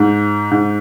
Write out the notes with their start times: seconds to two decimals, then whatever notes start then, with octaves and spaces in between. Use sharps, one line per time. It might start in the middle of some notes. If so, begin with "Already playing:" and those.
Already playing: G#2
0.51 G#2